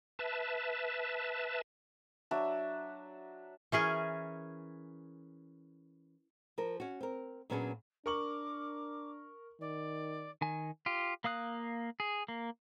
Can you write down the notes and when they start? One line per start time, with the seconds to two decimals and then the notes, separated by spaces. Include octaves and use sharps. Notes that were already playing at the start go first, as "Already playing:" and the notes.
0.19 B4 E5 A5
2.31 F#3 D4 E5
3.72 E3 C#4 G#4 A#4
6.58 F3 A#4
6.80 C#4 F#4
7.01 C4 A#4
7.50 A#2 F#3 B3 C#4 D4 G#4
8.06 D4 A#4 C#6 D6 F#7
9.61 D#3 D5
10.41 D#3 G#5
10.86 F4 G4
11.24 A#3 F5 D#6 F#6
12.00 G#4
12.28 A#3